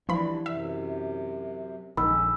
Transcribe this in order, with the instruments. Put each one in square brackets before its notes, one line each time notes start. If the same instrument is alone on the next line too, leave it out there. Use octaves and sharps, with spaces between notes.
[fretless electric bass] E3 [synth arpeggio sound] F3 B5 [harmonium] G3 D4
[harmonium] F#2 C3 [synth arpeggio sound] E5
[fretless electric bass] A#1 [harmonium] F2 G#3 C#4 [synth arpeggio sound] D#3 [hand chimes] B5 E6